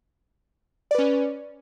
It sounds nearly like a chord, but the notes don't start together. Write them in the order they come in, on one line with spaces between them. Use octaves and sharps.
D5 B4 C#4